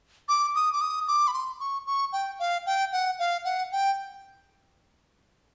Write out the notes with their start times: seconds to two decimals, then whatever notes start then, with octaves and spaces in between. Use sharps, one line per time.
0.29 D6
0.55 D#6
0.73 D6
0.81 D#6
1.08 D6
1.28 B5
1.34 C6
1.60 C#6
1.87 C#6
2.13 G5
2.39 F5
2.66 G5
2.93 F#5
3.19 F5
3.45 F#5
3.72 G5